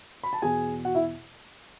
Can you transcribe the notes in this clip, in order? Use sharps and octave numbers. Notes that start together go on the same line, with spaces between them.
B5
A5
E2 B2 G#4 G#5
F#4 F#5
E4 E5